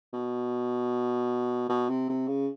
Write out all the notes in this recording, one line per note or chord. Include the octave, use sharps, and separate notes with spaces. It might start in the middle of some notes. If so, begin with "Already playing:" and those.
B2
B2
C3
C3
C#3